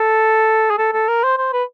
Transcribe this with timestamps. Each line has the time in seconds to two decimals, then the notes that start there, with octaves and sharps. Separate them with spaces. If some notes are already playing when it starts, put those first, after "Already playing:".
Already playing: A4
0.70 G#4
0.78 A4
0.93 A4
1.08 A#4
1.24 C5
1.38 C5
1.53 B4